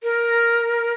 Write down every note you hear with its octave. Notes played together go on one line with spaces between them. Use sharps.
A#4